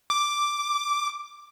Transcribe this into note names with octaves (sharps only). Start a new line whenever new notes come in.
D6